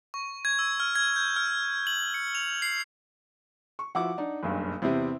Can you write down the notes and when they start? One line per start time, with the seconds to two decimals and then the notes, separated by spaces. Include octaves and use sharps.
0.14 C#6
0.45 G#6
0.59 E6
0.80 F6
0.95 G#6
1.16 G6
1.36 F6
1.87 F#7
2.14 C#7
2.35 F7
2.62 C7
3.79 C#6
3.95 F3 E4 F#4 F#5 D6
4.18 D4 D#4
4.43 F#1 B1 G2
4.82 E2 C3 C4 E4